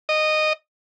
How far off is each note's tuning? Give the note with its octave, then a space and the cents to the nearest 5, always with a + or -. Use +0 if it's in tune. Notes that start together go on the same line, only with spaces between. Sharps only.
D#5 -15